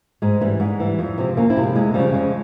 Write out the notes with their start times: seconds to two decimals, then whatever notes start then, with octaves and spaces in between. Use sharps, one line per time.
0.22 G#2 G#3
0.41 E3 G3
0.60 G#2
0.80 E3 G3
0.99 F2
1.18 C3 F3 G#3 C4
1.37 F2 A#3 C#4
1.50 C4 E4
1.57 C3 F3
1.62 G#3 C4
1.75 F2 G#3
1.94 C#3 F3 G3
2.14 F2 G#3